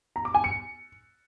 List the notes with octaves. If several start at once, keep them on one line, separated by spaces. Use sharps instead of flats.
A#5
D6
G#5
C#7